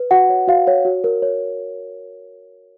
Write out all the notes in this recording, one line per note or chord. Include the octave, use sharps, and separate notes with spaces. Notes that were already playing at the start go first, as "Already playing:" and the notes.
Already playing: B4
F#4 F#5
C#5
F#4 F5
C#5
F#4
A#4
C#5